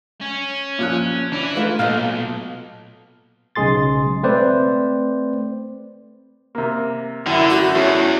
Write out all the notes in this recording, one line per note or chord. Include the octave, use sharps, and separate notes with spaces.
C#4
A#2 F3 F#6
E3 D4 E4
G#3 A3 D#4 F4 B4
B1 A#2 A4 D#5 F5 F6
B1 C#3 G#3 G#4 C6 A6
A3 C4 B4 C5 D5
C3 A#3
F#2 D3 E4 G5 E6
A3 F#4
E2 C#4 E4 G#4